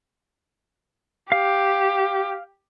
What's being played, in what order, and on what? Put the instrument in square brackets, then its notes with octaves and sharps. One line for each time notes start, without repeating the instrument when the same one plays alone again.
[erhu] G4 [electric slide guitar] F5